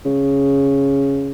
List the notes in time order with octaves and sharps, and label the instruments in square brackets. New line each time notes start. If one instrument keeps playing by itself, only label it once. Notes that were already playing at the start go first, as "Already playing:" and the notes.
[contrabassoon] C#3